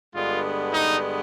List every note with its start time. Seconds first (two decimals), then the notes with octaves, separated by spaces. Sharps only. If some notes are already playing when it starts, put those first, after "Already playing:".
0.14 G2 D3 G#3 B3 F4
0.73 D#4